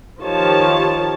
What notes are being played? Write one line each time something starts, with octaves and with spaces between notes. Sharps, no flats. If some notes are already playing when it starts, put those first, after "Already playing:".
D#3 F3 F4 G4 C#5 A5